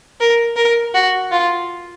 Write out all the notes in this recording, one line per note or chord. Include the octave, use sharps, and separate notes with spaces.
A#4
A#4
F#4
F4